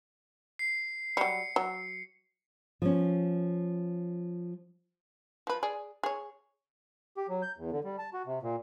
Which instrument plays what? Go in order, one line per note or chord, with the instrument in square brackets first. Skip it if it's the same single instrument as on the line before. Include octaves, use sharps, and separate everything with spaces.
[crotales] C7
[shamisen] F#3 G3 [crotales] C#7
[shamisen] F#3
[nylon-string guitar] F3 C#4
[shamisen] F3 B4
G#4 D5
G#4 C#5
[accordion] G4
F#3
G6
E2
D3
G3
A5
F#4
C3
A#2